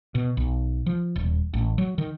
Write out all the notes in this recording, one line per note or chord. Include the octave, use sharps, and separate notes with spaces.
B2
B1
F3
D#1
A1
F#3
D#3